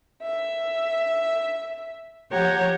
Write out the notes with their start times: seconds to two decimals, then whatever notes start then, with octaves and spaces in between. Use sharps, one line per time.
0.23 E5
2.32 F3 G4 C#5 F#5 A#5